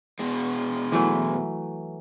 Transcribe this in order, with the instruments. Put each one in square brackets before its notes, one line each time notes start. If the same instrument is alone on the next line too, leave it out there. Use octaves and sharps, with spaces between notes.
[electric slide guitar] B2 G#3
[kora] E3 F#3 A3